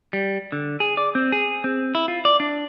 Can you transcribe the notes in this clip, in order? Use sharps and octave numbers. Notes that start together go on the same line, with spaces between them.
G3
D3
G#4
D5
C4
G#4
C4
E4
F4
D5
D4